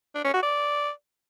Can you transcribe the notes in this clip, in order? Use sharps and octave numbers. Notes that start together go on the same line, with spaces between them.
D4
C#4
F#4
D5